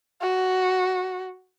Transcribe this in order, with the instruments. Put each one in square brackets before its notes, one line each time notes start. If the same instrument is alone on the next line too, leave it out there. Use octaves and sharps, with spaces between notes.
[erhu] F#4